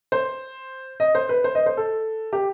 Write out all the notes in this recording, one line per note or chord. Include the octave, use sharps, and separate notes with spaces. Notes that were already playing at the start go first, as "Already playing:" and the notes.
C5
D#5
C5
B4
C5
D#5
C5
A4
G4